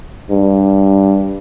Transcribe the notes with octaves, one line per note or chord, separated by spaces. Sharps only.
G2